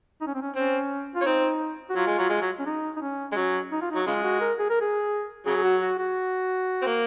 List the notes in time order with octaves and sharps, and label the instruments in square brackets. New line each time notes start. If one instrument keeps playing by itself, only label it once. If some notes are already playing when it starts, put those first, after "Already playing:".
[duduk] D#4
C#4
C4
C#4
[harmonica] C4 [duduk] C#4
[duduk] F4
[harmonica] C#4
[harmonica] C4 [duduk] D#4
[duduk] F#4
[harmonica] F#3 [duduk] F4
[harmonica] G#3
F#3
G#3
F#3
[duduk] C#4
D#4
D#4
C#4
[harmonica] G#3
[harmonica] F#3 [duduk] C#4
[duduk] D#4
F4
[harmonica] F#3 [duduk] D#4
[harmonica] C#3 G#3 [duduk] F4
[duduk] F#4
A#4
G#4
A#4
G#4
[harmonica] C#3 F#3 [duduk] G#4
[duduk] G#4
F#4
F#4
F#4
[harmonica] C4
A#3